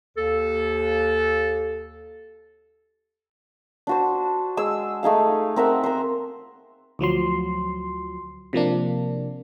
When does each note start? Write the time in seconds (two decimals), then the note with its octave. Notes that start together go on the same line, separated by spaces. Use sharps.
0.16 D#2 A4
3.87 D4 F#4 C5
4.57 G#3 G#4 E6
5.03 A3 D#4 G#4 F5
5.56 C4 A#4 E5 F#5
5.84 A#4 C5
6.99 D2 F3 F#3 C6
8.53 C3 F3 A#3 D4